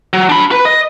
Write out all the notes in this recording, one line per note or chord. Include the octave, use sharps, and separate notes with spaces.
F#3
D4 B5
B4
D#5